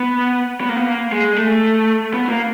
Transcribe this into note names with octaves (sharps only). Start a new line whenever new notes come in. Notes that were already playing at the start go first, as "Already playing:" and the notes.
Already playing: B3
B3
A#3
B3
A#3
G#3
A3
B3
A#3